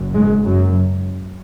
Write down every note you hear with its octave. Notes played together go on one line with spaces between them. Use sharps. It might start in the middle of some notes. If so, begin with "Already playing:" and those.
Already playing: F#1 F#2
G#2 G#3
F#2 F#3